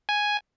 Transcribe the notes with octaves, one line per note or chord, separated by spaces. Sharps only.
G#5